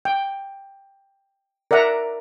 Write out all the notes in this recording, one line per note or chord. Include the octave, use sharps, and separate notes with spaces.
G5
A#4 D5 E5 F#5 A#5